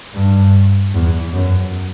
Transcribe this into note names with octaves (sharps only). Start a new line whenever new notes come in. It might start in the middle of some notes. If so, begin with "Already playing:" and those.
G2
E2
F#2